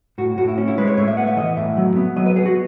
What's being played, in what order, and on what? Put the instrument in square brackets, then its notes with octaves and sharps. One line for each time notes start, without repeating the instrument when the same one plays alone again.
[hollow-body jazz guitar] A2 F#4
A2 F#4
E4
C#4
E4
G#3 B4
C#5
A2 C#5
E5
B3 F#5
E5
E3 D#5
A2 E5
F#3
B3
F#3 D#5
B4
B3 G#4
F#4